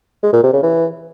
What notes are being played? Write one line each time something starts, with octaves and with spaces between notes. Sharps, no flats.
G#3
A#2
C3
C#3
E3